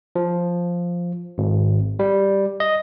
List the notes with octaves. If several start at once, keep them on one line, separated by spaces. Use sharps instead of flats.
F3
G#1
G3
D#5